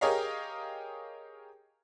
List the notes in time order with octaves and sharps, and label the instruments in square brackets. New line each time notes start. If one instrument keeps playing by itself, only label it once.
[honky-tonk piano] G4 G#4 A#4 C#5 D#5 F5